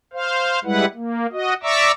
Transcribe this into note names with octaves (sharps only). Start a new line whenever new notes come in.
C5 F5
G3 G#3 E4 B4 F#5
A#3
F#4 D#5
D5 E5 A#5 C#6 D6 E6